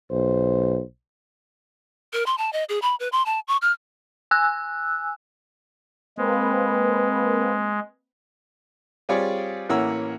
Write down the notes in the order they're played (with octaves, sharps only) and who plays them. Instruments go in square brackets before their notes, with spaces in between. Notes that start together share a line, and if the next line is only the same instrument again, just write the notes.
[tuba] B1 [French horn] C5
[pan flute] A#4
C6
A5
D#5
G#4
B5
B4
C6
A5
C#6
F6
[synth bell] G#5 E6 F#6
[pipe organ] G#3 [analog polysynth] A#3 C4 B4
[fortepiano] G3 C4 F4 G#4 C#5 D5
A1 E3 A#3 C#5 F#5 E6